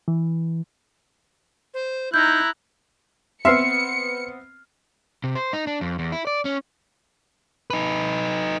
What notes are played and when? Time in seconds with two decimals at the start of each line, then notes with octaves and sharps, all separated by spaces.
0.08 E3
1.74 C5
2.14 D#4 E4 A#5 F#6 G6
3.45 B3 C4 E5 C6 F6 C7 C#7
5.24 C3
5.35 C5
5.53 D#4
5.67 D4
5.81 F2
5.99 E2
6.12 E4
6.27 D5
6.45 C#4
7.70 D#4 B4